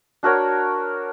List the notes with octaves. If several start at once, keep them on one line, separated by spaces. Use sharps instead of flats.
D4 F#4 A#4 C#5